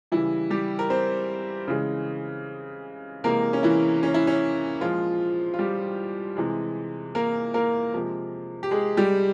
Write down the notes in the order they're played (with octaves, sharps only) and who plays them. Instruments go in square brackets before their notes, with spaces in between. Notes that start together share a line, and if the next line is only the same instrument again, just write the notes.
[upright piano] C#3 E3 G3 E4
G3 G4
A#4
C4 C5
C#3 E3 G#3
C3 E3 G#3 A#3 A#4
C#4
E3 E4
C#4
E4
C#4
A#2 F3 G#3 F4
F4
G3 G4
C3 E3 G#3
A#3 A#4
A#3 A#4
C3 F3 G#3
G4
G#3 G#4
G3 G4